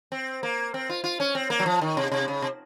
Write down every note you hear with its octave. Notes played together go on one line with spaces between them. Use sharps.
C4
A#3
C4
F4
F4
C#4
C4
A#3
F#3
F3
D#3
C3
C3
C#3
C3